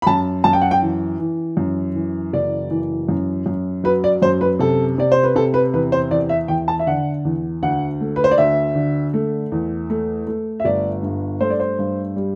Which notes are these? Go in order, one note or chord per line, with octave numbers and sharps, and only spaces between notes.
B5
F#2 A5
F#2 A5
G5
F#5
G5
E3
E3
F#2
E3
F#1 D5
E3
F#2
F#2
F#3 B4
D5
F#2 C5
B4
C3 A4
C3 D5
C5
B4
C3 A4
B4
E2 B4
C5
E2 D5
E5
E2 G5
A5
E5
D3 F#5
E2
D2 F#5
A3
B4
C5
D5
D2 E5
D3
A3
E2
A3
A3
E5
G1 D5
G2
A3 C5
D5
C5
G2
G3